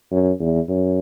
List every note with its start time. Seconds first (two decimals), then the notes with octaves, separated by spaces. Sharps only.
0.11 F#2
0.39 E2
0.69 F#2